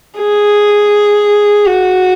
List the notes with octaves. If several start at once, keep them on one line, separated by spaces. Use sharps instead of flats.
G#4
F#4